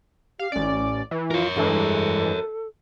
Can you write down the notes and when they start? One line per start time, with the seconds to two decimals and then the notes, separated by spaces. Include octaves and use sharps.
0.39 G4 F5
0.52 A1 C#4 D5
1.11 E3
1.31 F4 A#4 C#5
1.56 G2 E3 G#3 A4